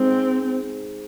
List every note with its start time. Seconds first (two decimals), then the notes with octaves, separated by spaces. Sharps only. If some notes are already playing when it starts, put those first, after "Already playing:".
Already playing: G#3 C4 D#4 G#4 C5